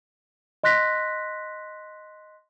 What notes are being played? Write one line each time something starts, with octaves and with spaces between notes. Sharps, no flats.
D#5 C6 F#6 A#6 B6